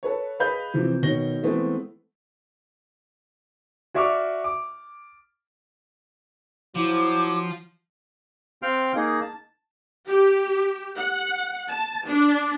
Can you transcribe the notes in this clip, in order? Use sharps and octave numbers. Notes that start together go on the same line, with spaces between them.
A4 B4 C#5
G#4 B4 D#5 F5 B5 G6
C3 E3 F3 C4
B2 D#3 C#5 A#6 G7
E3 G#3 A3 B3 C4 G#4
F#4 D5 E5 C#6 D6 F6
D6
F3 F#3 E4 D6
C4 F5 G5 C6 F6
A#3 D#4 G#4
A5
G4
F#5
A5
D4